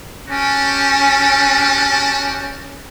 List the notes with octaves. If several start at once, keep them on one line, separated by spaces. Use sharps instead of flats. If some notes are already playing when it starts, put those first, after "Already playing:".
C#4 F#4 G4 A5